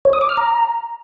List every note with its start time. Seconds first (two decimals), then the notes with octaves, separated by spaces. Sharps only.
0.05 C#5
0.13 D#6
0.21 D6
0.29 F6
0.37 A#5